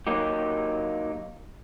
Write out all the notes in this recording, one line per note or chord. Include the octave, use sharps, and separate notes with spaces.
F#3 A#3 D#4 G4